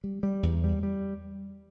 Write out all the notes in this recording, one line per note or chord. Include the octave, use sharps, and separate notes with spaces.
G3
G3
E2
G3
G3